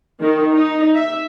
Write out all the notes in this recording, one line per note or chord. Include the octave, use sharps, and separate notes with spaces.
D#3
D#4
E5